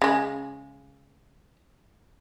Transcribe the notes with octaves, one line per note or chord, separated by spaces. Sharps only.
C#3 G#3